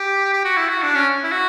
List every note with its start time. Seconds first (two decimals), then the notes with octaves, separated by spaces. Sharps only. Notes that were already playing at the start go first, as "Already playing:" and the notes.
Already playing: G4
0.33 G4
0.45 F#4
0.57 E4
0.68 F#4
0.83 D4
0.95 C#4
1.23 E4
1.32 F#4